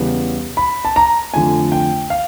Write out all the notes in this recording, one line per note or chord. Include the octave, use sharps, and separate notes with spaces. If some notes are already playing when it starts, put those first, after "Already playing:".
Already playing: E2 C#3 E3 G3 B3
B5
A5
A#5
F2 D3 F3 A3 G#5
G5
F5